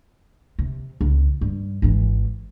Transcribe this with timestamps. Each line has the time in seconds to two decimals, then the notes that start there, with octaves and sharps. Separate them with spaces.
0.59 C3
1.01 C#2
1.41 G2
1.82 G#1 E3